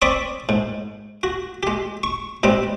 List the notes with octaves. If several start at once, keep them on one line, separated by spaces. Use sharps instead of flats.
C4 D5 B5 C#6 D#6
G#2
F#4
G#3 G4
C#6
G#2 G3 B3 C4